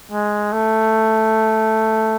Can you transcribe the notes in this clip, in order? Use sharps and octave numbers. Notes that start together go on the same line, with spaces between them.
G#3
A3